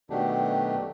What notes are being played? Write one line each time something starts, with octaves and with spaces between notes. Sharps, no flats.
B2 D#3 F#3 A3 D4 G4